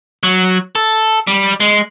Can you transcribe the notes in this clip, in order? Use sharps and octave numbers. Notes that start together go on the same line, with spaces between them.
F#3
A4
G3
G#3